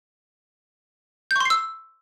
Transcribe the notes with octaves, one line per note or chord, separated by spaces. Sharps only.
C6 C#6 E6 G6 C7